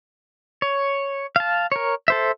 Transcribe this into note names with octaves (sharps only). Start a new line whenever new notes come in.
C#5
F5 A5
A#4 C#5
A4 C5 E5